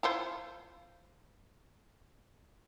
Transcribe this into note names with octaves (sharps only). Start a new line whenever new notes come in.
E4 F4 C5